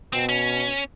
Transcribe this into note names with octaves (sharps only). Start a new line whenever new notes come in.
B2 C4
C#4